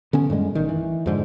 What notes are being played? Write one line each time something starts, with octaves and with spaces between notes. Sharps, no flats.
D3 B3 C#4
F#2 A2 G3 G#3
B1 G2 D#3
E3
F2 G#2 D3